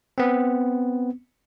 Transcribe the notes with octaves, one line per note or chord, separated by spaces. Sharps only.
B3 C4